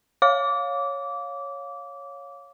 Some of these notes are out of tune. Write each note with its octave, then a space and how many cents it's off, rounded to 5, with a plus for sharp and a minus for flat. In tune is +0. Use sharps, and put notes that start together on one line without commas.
C#5 +0 F5 +15 D6 -20